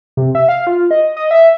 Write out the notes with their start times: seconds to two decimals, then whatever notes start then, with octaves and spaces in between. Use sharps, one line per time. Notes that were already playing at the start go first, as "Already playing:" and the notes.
0.17 C3
0.35 E5
0.49 F5
0.67 F4
0.91 D#5
1.17 D#5
1.31 E5